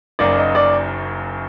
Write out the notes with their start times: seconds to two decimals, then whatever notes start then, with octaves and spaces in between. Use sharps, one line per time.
0.19 F#1 F#2 F#3 A#3 D#4 D5
0.37 D#5
0.55 D5